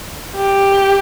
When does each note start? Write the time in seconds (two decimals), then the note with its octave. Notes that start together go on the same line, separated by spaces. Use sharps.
0.36 G4